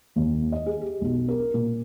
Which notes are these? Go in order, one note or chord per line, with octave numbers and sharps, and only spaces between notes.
D#2
D#5
G#4
G4
B1
A#4
A#2